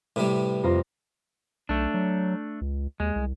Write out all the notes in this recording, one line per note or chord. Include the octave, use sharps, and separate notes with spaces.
A2 C3 G3 B4
F2 F4 A#5
B1 A3 D4
F#3
C#2
D#2 G#3
C2